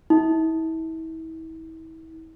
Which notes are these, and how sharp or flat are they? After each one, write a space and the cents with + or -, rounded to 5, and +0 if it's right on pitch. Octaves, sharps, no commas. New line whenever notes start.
E4 -35